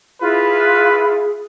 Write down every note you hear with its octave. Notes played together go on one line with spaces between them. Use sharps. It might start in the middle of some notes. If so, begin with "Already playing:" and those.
E4 F4 G#4 B4